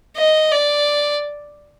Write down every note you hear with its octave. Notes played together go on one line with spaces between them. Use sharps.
D#5
D5